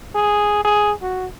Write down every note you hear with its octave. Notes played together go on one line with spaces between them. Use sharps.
G#4
G#4
F#4